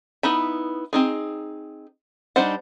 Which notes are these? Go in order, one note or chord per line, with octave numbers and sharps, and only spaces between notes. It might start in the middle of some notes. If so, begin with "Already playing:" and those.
B3 D#4 E4 B5
C4 D#4 G#4
G3 D4 D#4 C5 F#5